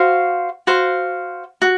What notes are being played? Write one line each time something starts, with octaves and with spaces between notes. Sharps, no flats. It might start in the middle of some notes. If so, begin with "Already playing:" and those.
Already playing: F#4 C5 F5
F#4 C5 F5
F#4